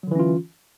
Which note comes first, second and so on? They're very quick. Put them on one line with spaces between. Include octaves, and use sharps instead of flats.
F#3 D3 E3 C#4 F4